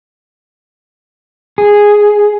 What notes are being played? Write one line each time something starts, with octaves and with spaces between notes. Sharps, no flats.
G#4